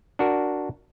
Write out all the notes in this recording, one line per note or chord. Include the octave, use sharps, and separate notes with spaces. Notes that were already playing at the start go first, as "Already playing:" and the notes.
D4 F#4 A#4